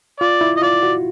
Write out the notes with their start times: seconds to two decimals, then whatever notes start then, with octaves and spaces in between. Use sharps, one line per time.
0.21 F4 D5
0.41 E4
0.57 D#5
0.62 F4 D5
0.83 F#4